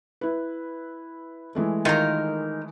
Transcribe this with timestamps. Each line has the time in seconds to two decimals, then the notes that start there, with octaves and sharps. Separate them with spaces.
0.21 E4 B4
1.55 E3 G#3 A3
1.85 D#3 D#4 F4 A#4 C#5